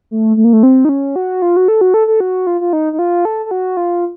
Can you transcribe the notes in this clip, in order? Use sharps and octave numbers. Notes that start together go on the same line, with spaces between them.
A3
A3
A#3
A3
C4
D#4
C#4
F#4
F4
F#4
A4
F#4
A4
A4
F#4
F4
F4
D#4
D#4
F4
A4
A4
F#4
F4